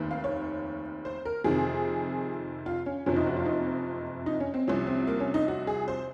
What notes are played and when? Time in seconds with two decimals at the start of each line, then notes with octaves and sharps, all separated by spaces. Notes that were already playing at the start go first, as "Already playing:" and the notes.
Already playing: F1 D#2 D#3
0.11 F5
0.24 C#5
1.05 C5
1.25 A#4
1.44 F2 C3 D#3 G#4
2.66 F4
2.86 C#4
3.06 F#1 F2 C3 F3 C#4
3.16 D#4
3.26 F#4
3.37 F4
3.46 D#4
4.26 D#4
4.40 C#4
4.54 C4
4.67 C2 C3 F3 C#4
4.87 C4
5.07 A#3
5.20 C#4
5.34 D#4
5.48 F#4
5.67 G#4
5.88 C5